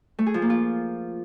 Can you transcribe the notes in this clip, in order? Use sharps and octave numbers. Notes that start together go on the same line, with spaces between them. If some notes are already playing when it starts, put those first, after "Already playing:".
A3
G#4
F3
A#3
F4